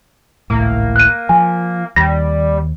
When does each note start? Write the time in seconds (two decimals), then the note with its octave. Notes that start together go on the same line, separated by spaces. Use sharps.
0.50 G#1 C#2 A2 A#3
0.96 F#6 D#7
1.29 F3 G#5
1.96 D#2 G3 A#6